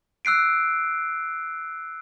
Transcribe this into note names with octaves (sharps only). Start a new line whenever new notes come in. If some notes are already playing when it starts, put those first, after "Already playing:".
E6 F#6 C7 D7